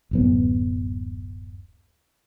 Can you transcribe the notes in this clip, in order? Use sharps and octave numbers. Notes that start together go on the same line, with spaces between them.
D1 F#2 B3